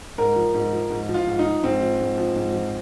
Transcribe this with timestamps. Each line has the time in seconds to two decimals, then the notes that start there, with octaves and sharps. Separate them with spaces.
0.18 G#2 A#4
0.36 F3
0.55 G#2
0.73 F3
0.90 G#2
1.09 F3
1.14 F4
1.27 G#2
1.39 D#4
1.45 F3
1.63 G#2 C4
1.81 F3
1.99 G#2
2.18 F3
2.36 G#2
2.54 F3